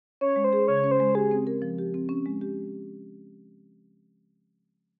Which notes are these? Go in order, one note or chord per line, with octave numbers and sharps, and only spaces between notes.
C#4 C#5
G#3
C5
G#4
C#3 C#5
C#4
C5
G#3
G4 G#4
C4
A#4
F3
G4
C4
C#4
G#3
G4